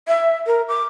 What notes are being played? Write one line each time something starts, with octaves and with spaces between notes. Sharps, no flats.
E5
A#4
D6